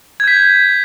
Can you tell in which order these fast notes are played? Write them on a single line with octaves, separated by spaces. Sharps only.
G#6 G6 B6